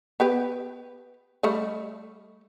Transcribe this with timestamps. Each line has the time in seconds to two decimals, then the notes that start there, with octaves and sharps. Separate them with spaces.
0.20 B3 G4 B4
1.43 G3 A3 D#5